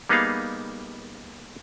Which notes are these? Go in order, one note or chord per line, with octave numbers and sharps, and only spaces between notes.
G3 A#3 B3 D#4 G#4 F5